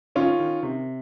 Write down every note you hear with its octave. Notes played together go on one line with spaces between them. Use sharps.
D#3 C#4 F4
D#3
C3